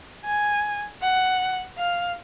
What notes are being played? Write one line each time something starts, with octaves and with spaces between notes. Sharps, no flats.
G#5
F#5
F5